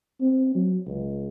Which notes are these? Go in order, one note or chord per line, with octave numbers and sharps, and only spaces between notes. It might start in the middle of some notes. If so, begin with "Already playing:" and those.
C4
F#3
C#2